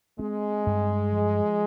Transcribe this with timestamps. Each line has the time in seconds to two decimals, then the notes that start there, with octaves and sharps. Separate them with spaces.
0.19 G#3 C4
0.67 G2
1.12 F3